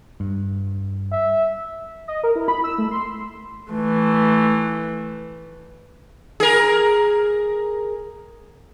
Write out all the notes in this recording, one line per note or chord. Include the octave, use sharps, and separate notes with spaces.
G2
E5
D#5
A#4
E4
B5
E6
A3
C6
E3 A3
G#4 A#4